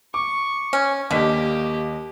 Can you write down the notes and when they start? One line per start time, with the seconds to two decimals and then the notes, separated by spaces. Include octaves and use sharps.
0.14 C#6 D6
0.73 C#4
1.11 D#2 D3 A#3 G4 D#5 B6